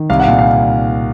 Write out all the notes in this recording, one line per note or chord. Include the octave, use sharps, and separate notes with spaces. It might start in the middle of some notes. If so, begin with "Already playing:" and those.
Already playing: D#3
C2 F5
F#5
F5
A#2
F5